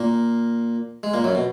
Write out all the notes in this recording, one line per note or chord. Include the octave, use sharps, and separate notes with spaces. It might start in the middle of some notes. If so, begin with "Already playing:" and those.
Already playing: A#2 A#3
G#3
A#2 A#3
F#2 F#3
B2